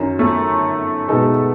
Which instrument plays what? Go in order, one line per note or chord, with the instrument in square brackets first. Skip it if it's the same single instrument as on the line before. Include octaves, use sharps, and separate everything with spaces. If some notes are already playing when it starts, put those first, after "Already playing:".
Already playing: [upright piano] F#2 D#3 F#3 C#4
[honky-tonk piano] A3
[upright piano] B2 G#3 D#4 A4